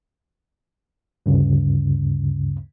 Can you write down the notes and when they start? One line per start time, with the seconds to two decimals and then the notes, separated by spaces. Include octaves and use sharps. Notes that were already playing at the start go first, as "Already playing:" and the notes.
1.26 D2 G2 C#3